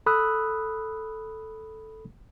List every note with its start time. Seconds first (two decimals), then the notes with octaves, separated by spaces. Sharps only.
0.06 A4 B5 D#6 E6 F#6